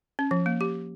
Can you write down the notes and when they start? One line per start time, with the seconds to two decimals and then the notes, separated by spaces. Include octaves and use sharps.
0.19 C#4
0.31 F3
0.46 A#3
0.61 G4